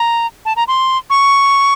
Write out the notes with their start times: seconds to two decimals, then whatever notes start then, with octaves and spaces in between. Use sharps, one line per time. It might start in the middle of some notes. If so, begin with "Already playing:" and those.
Already playing: A#5
0.45 A5
0.56 A#5
0.68 C6
1.10 C#6